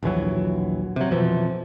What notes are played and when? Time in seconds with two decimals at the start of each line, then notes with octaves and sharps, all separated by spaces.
0.03 A#1 D#2 E3 F#3
0.96 C3 F#3
1.11 F2 B2 E3 F3